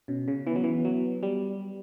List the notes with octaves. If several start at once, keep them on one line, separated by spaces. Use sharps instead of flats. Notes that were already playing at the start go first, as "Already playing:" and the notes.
B2 C#4
C#3
E3 B3
F#3
E3
F#3
G3